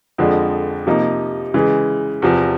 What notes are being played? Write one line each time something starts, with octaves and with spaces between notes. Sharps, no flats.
F2 D3 F3 G#3
C3 F3 A#3 D#4
C#3 E3 G#3
E2 C3 F3